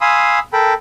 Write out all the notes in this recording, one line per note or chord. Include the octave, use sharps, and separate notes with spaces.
F5 G#5 B5 C6 D#6 E6
A4 A#4 G5 B5